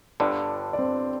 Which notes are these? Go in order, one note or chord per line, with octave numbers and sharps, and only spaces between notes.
G1 G2 D3 D4 D5
D5
C4 C5